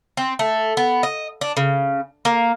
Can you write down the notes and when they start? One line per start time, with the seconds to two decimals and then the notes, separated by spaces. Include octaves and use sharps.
0.17 C4
0.39 A3
0.77 B3
1.03 D#5
1.41 D4
1.57 C#3
2.25 A#3